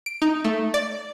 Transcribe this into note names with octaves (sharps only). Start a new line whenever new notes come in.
D7
D#4
A3
D5